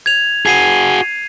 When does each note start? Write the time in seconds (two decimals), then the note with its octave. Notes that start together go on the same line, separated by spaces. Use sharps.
0.06 G#6 F7
0.46 F#4 G#4 G#6 C7 D#7